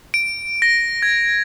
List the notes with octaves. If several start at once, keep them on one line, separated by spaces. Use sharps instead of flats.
D7
A#6
G#6